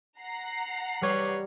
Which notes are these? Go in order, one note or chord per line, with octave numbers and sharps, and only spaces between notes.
F#5 A#5 C7
G3 G4 B4 C#5